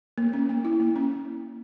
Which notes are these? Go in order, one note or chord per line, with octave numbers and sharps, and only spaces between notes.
A#3
C#4
A#3
E4
A#3
C#4